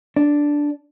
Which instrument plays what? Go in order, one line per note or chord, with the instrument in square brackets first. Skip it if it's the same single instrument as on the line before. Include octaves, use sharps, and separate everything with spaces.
[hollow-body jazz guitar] D4